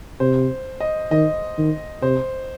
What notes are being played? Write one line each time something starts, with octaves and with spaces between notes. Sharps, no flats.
C3 C5
D#5
D#3 D#5
D#3
C3 C5